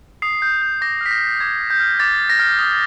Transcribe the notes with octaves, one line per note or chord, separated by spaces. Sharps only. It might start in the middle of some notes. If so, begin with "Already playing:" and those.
D#6 C7
G6
G6
D6 A#6
F6 B6
A#6
F6
D6 G#6
F6
G6
F6
D6 A6
F6
A#6
F6
D#6